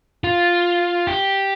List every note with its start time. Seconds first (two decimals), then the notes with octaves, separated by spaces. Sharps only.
0.24 F4
1.07 G4